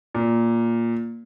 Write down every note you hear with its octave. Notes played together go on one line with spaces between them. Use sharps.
A#2